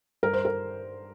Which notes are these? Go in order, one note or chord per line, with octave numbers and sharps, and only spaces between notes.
G2 A#4
C5
A#4